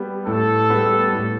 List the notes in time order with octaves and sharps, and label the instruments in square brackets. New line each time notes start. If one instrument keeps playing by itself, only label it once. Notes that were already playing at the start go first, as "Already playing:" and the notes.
Already playing: [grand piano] G3 B3
[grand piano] A2 [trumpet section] A4
[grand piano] G3 B3
A2